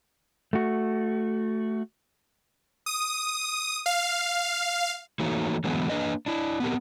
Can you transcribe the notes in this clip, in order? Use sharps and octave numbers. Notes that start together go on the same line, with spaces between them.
A3 F#4
D#6
F5
E3 A3 A#3 D#4 F#4 C#5
D3 E3 F#3 G#3 A3 B3
A#3 D4 B4 D#5
D4 E4
B3 C4 G4 A#4